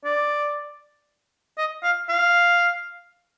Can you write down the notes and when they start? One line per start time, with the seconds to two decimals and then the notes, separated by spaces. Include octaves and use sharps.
0.05 D5
1.57 D#5
1.83 F5
2.09 F5